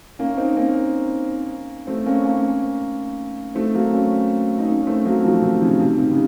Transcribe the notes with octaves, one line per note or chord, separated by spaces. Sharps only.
A#3 C#4
C4 D#4
A#3 C#4
A3 C4
A#3 C#4
A#3 C#4
A3 C4
F#3 A#3
A#3 C#4
D#4
A#3 C#4
A3 C4
F#3 A#3
F3 A3
C3 D#3
C#3 F3
C3 D#3
C3 D#3
C#3